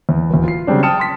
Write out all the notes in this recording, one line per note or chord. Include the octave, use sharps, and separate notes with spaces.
E2
D1 E2
F4 C7
C#3 F#3 G3 C4 D4
G5 A5 D#6 F6 C#7 E7
A5 C6 B6